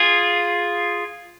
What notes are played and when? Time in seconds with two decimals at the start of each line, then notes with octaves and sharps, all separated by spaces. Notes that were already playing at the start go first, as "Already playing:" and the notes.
Already playing: F4 G#4